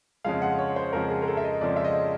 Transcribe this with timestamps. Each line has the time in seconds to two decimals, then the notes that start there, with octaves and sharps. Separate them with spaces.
0.25 F2 C#3 F3 G#3 F5
0.42 F#5
0.58 C#5
0.76 C5
0.93 F2 C#3 F3 G#3 A#4
1.10 G#4
1.22 A#4
1.28 A4
1.37 E5
1.44 D#5
1.61 F2 C#3 F3 G#3 D5
1.76 E5
1.84 D#5